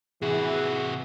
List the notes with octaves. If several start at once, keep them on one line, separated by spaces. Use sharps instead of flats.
C3 E3 F#4 G#4